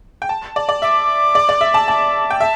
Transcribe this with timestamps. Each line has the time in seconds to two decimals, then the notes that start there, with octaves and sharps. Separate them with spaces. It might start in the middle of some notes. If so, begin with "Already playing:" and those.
0.22 G5
0.29 A5
0.56 D5
0.69 D5
0.82 E5 D6
1.35 D5
1.49 D5
1.61 E5
1.74 A5
1.88 A5 D6
2.30 G5
2.41 E5 A5